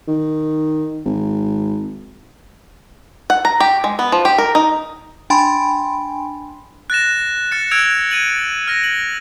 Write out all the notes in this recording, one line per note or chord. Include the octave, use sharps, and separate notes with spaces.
D#3
G#1
F#5
A#5
G4
G#3
B3
F3
G4
A#4
D#4
D4 G5 G#5 B5 C6
F#6 A6 A#6 E7
F6 F#6 A6 C#7
E6 F#6 G#6 D7 F7
G#6 D#7 F#7
F6 A#6
F#7